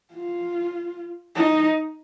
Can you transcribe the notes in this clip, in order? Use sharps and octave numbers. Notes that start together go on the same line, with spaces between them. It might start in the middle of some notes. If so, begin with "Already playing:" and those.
F4
D#4